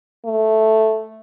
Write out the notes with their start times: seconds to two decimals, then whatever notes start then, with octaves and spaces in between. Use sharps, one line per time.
0.25 A3